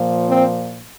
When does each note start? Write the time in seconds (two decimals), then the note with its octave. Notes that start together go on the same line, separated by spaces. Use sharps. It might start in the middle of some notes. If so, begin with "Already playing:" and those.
Already playing: A#2 F3
0.29 C4